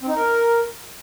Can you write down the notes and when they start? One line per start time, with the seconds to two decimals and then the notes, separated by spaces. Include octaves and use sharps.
0.01 C4
0.08 D#4
0.15 A#4